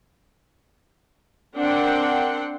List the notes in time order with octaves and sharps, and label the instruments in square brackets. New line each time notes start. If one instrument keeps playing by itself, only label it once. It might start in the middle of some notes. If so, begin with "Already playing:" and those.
[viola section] C4 D4 A#4 F#5 G5 C6